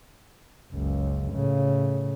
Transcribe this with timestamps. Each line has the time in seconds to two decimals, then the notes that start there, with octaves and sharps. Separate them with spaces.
0.73 F#1 C#2
1.32 A2 C#3